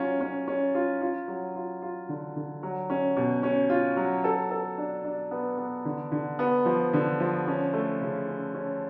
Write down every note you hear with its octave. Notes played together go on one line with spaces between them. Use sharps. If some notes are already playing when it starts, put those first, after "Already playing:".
Already playing: F#3 C#4 F4
C#4
C#4
F4
F4
F#3
F4
F4
D3
D3
F#3
C#4
B2
C#4
F4
F#3
A4
A4
D4
D4
B3
B3
D3
D3
B3
F3
D3
F3
C#4
A3
C#3
C#4
C#4